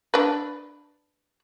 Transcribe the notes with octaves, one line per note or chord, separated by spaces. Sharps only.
D4 B4